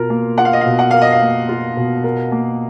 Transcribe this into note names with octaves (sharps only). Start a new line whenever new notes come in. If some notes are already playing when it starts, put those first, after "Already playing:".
Already playing: B2 F4 A#4
A#3
F4 F#5
F5
D#5
F5
B2
F#5
A#4 F5
D#5
F5
A#3
F4
B2
A#4
A#3